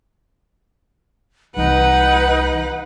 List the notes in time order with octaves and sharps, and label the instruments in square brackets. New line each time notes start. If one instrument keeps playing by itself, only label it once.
[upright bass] C2 E3 [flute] D#4 [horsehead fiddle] B4 [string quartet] F#5